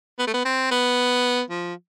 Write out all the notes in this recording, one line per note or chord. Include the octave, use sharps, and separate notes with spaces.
B3
A3
B3
C4
B3
F3